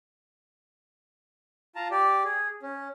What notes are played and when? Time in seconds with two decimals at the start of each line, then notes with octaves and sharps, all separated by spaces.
1.75 F4 A5 A#5
1.91 G4 D5
2.24 G#4
2.62 C#4